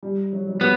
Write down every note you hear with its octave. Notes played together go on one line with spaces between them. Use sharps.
G3
F#3
F#3
G3
F#3 B3